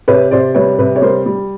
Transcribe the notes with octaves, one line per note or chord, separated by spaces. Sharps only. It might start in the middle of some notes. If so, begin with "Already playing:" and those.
C3 B4 C#5
C3 C5 D5
G3 B4 C#5
C3 B4
C#5
G3 A#4 C5
G3